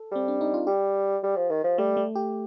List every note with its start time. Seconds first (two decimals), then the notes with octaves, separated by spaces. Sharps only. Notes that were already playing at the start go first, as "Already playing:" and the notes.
Already playing: A4
0.11 G3 C4
0.28 D4
0.41 D#4
0.54 F4
0.67 G3 G4
1.23 G3
1.36 F3
1.50 D#3
1.64 F3
1.78 G3 A3
1.97 A3
2.16 G4